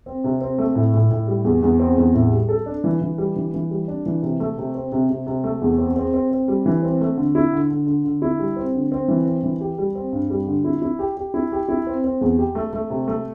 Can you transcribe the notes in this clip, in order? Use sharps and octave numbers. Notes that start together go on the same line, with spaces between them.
C4
C3
C4
A3
A2
A2
A2
G3
E2
E2
C4
E2
A2
G3
A4
D4
E3
E3
G3
E3
E3
G3
D4
E3
C3
A3
C3
C4
C3
C3
C3
A3
E2
C4
C4
C4
C4
G3
E3
C4
A3
D3
E4
D3
D3
D3
D3
E4
G3
C4
D3
C4
E3
C4
E3
G4
G3
C4
G2
G3
D3
E4
E4
G4
G4
E4
G4
E4
C4
C4
E2
G4
A3
A3
C3
A3